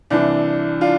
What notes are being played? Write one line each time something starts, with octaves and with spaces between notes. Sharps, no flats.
C2 C3 E3 D4
D4 F4